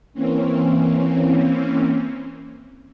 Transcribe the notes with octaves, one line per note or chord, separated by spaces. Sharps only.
E3 A#3 C4 C#4